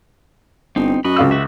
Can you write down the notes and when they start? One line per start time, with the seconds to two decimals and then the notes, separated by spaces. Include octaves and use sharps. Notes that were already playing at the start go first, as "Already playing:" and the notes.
0.76 G1 C4 D#4
1.05 F#2 F#4 D#5 B5
1.16 C#2 F5 E6
1.31 F#4 E5